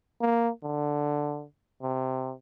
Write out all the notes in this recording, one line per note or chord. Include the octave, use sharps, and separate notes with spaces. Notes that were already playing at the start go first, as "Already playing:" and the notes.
A#3
D3
C3